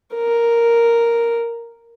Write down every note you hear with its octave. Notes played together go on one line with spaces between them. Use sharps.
A#4